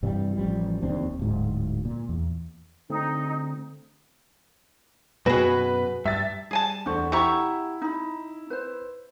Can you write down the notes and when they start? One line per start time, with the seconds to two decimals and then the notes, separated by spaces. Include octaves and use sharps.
0.03 G2 C3 E3 G3
0.36 A1 F3 G3
0.82 F1 D#2 C4 D4
1.19 D1 G#2
1.85 A#2
2.09 E2
2.90 D3 A3 C4 D#4
5.26 F#2 B2 F#4 G#4 B4
6.05 G2 E5 A6
6.51 G3 G#4 G#5 A5
6.86 E2 A3 D4 C5 C#6
7.12 C3 E4 G4 E5 F#5 A#5 C#6
7.82 D#4 B5
8.50 B4 C5